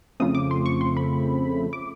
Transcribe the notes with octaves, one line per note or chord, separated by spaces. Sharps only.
F2 C#3 F3 A3 C4 D#6
D6
C6
C#6
C6
B5
D6